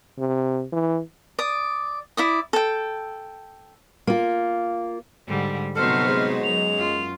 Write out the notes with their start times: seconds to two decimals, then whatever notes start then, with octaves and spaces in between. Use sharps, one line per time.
0.19 C3
0.73 E3
1.39 D5 D#6
2.17 E4 D5 D#6
2.53 A4 G5
4.07 A#3 F4
5.28 G#2 D3 G3
5.76 C3 F#3 B3 D#4 F#4 A4 C5 F6
6.08 G#3
6.44 F#2 F7
6.78 F4